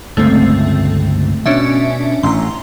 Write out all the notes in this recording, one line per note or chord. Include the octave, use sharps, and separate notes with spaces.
G1 C#2 A#2 A3 C4
B2 C#4 D4 E5
A1 A2 A#5 C6